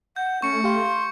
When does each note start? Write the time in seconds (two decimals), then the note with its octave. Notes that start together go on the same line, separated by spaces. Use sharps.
0.16 F#5 G6
0.42 A3 C#4 C#6 C#7
0.64 G4 F5 C6